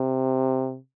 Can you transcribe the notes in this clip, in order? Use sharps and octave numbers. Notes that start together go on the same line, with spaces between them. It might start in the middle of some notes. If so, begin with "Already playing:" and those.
Already playing: C3